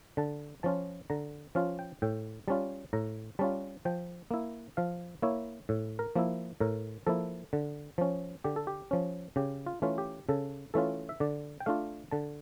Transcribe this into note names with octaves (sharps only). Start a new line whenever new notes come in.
D3 A5
F3 C#4 F4 A5
D3 A#5
F3 C#4 F4 F5
G5
A2 G5
G3 C#4 F4 A5
A2 A#5
G3 C#4 F4 A5
F3 G5
A#3 E4
F3 F5
A#3 E4 C#5
A2
A#4
F3 A#3 E4
A2 A#4
F3 A#3 E4 A4
D3
F3 C#4
D3 G4
A4
G4
F3 C#4
C#3 G4
F4
E3 A3 C#4 F4
G4
C#3 A4
E3 A3 C#4 F4 A4
E5
D3 D5
G5
A3 D4 F4 F5
D3 A5